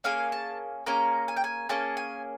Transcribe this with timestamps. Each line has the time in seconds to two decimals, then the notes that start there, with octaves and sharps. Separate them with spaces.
0.04 A#3 C#4 G#4 F5
0.32 A5
0.86 A#3 C#4 G#4 A#5
1.28 G#5
1.36 G5
1.44 G#5
1.69 A#3 C#4 G#4 A5
1.97 G#5